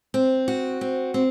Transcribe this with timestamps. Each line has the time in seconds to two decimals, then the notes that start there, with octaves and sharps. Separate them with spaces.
0.14 C4
0.48 F#4
0.81 C4
1.14 C4